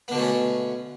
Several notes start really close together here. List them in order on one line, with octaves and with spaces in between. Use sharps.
B3 D3 B2 A3 C#4